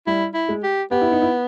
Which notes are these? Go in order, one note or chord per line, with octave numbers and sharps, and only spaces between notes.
G3 E4
E4
G#3
G4
B3 G4
E4
D#4
E4